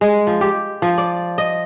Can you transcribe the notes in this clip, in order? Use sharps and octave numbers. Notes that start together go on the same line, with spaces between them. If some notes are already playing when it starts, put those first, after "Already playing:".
G#3
F3
G4
F3
D5
D#5